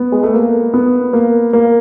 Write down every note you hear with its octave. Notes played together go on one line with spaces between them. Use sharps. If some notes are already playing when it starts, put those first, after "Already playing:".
Already playing: B3
G#3
A3
A#3
B3
A#3
A#3